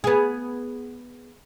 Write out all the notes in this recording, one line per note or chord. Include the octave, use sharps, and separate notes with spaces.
B3 G#4